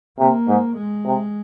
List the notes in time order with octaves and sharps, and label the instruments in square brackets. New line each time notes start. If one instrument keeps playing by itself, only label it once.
[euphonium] C3 [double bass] A#3
[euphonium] G#2
[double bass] G#3
[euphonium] C3